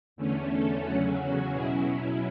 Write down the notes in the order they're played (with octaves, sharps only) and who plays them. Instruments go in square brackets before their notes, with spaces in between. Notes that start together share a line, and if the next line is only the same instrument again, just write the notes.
[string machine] E2 D3 A3 C#4
A4
E2 C#3 F#3 C#4 F#4
F#4
B2 F#3 C#4 E4 G#4